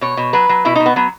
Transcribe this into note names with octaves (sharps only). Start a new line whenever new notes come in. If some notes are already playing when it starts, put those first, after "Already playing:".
B2 C#5
B2
F#3 B4
F#3
B2 E4
B2 D#4
B3
F#3 B3